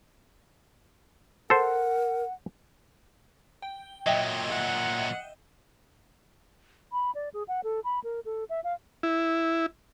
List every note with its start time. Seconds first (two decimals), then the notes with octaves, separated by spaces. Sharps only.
1.50 A4 A#4 C5 F#5
3.62 G5
4.06 A#2 F#3 D#5 E5 G5
4.50 F#5
6.92 B5
7.15 D5
7.34 G#4
7.48 F#5
7.64 A4
7.85 B5
8.04 A#4
8.25 A4
8.50 E5
8.64 F5
9.03 E4